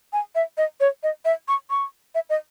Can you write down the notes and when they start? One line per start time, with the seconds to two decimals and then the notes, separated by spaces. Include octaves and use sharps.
0.13 G#5
0.35 E5
0.58 D#5
0.81 C#5
1.03 D#5
1.25 E5
1.48 C#6
1.70 C#6
2.15 E5
2.30 D#5